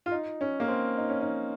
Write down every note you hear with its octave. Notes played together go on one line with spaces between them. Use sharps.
F4
D#4
C#4
A#3
C4
D#4
C#4
D#4